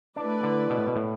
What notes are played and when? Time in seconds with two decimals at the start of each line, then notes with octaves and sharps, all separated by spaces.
0.16 A3 D4 E4 B4 D5
0.43 D3
0.70 B2
0.78 A2
0.87 B2
0.96 A2